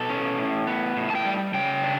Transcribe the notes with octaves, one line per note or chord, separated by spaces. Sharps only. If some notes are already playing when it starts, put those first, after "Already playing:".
Already playing: B2 A4
C#4
A2
B3
A2
A5
G5
G3
C#3 G5
D4